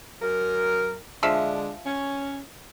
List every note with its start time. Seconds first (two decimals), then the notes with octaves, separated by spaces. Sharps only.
0.22 F#2 A#4
1.23 D3 F3 G#3 D4 E5 F5
1.85 C#4